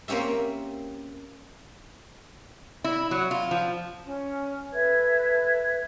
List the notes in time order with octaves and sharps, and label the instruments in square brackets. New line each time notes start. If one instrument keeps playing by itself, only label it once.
[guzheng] A#3 C4 C#4 G4 E5
[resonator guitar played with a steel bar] E4
F#3
F4
F3
[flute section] C#4
A4 B4 E5 G#6